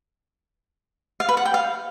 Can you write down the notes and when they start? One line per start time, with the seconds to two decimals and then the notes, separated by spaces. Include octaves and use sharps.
1.20 F5
1.29 B4
1.37 F#5
1.45 G5
1.54 F5